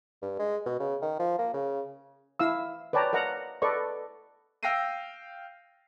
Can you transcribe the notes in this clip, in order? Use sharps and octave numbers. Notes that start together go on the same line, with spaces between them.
G2
G#3
B2
C#3
D#3
F3
A#3
C#3
E4 F5 E6
B4 C#5 D5 G5 A5 A#5
A#4 D#5 F#5 A#5
A4 B4 D5 D#5 C#6
F5 G5 E6 A#6 C7 D#7